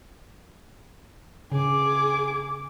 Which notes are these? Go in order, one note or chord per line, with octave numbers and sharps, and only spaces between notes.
C#3 G#4 D6